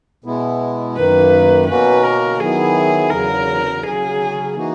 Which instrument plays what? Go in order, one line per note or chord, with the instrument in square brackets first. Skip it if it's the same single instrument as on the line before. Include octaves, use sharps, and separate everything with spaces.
[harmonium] B2 G#3 B3 E4
[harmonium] F#2 D#3 A#3 [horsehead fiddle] B4
[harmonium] B2 A#3 C#4 F#4 [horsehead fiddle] B4
[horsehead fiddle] A#4
[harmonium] D#3 F#3 B3 E4 [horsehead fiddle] G#4
[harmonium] E2 C#3 F#3 [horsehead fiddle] A#4
[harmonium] C#3 F#3 C#4 [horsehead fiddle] G#4
[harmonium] E3 A#3 D#4 F#4